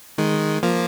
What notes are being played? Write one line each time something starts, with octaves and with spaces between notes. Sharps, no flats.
D#3 G#3
F3 A#3